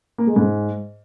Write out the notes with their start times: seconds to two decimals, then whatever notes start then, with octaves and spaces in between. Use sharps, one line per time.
0.18 A#3
0.27 G#3
0.36 G#2